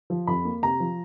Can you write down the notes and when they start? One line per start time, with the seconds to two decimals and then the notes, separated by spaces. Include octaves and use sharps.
0.10 F3
0.27 F2 B5
0.45 A#3
0.62 C3 A#5
0.80 F3